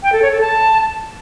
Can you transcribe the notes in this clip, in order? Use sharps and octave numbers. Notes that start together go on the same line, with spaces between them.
G5
A4
C#5
A4
A5